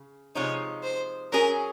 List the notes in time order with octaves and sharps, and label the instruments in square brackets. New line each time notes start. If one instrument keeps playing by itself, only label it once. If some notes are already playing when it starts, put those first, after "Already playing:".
Already playing: [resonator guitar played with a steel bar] C#3
[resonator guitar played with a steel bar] C3 F3 G#3 D#4 [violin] C#5
[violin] C5
[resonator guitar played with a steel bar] F#3 C#4 G#4 [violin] A#4